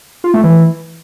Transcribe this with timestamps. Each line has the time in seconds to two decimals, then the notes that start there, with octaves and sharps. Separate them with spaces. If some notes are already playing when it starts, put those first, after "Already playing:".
0.24 F4
0.34 A3
0.44 E3